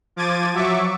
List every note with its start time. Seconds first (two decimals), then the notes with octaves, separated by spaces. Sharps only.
0.16 F3 D6 G#6 A6 D#7
0.54 F#3 E5 C#6 D6